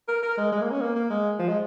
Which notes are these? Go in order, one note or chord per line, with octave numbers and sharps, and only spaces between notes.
A#4
A#4
G#3
G#3
A#3
C#4
A#3
A#3
G#3
F3
G#3